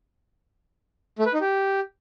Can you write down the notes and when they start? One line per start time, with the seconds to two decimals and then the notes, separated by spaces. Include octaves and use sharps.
1.19 A3
1.26 B4
1.34 D#4
1.41 G4